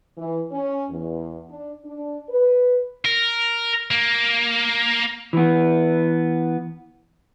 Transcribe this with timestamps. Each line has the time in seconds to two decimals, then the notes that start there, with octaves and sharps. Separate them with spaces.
0.17 E3
0.52 C#4
0.90 E2
1.50 D4
1.85 D4
2.30 B4
3.05 A#4
3.91 A#3
5.33 E3 B3